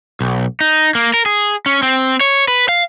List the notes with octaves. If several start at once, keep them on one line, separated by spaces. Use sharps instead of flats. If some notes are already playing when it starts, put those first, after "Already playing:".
B1
D#4
A#3
A#4
G#4
C#4
C4
C#5
B4
F5